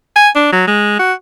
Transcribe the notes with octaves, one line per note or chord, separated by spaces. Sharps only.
G#5
D4
F#3
G#3
F#4